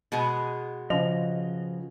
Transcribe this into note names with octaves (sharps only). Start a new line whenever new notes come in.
B2 G#3 B3
C#3 F3 D#5 F7